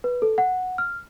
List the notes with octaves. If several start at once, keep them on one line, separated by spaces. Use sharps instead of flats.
B4
A4
F#5
F6